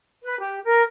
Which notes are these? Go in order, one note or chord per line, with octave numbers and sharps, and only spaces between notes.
B4
G4
A#4